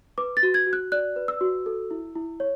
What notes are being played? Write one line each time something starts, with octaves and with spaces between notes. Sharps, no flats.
B4 D6
A6
F#4
G#6
F#4
F#6
D5 F#6
B4
E6
F#4
A4
E4
E4
C#5